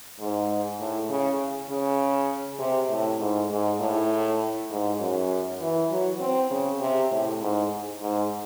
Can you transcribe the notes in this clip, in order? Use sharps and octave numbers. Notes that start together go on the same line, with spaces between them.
G#2
A2
C#3
C#3
C3
A2
G#2
G#2
A2
G#2
F#2
E3
F#3
C4
C#3
C3
A2
G#2
G#2